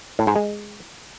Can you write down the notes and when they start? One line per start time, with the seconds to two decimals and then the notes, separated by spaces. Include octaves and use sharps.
0.19 A2
0.27 G#2
0.36 G#3